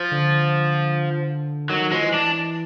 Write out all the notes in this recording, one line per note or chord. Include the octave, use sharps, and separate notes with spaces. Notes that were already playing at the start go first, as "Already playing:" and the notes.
Already playing: F3
D3
D#3 F#3
F3 G#3
E3
D4